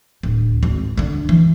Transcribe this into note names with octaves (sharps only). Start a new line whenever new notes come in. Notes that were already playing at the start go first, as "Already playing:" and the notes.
D1
G#1
D3 D4
E3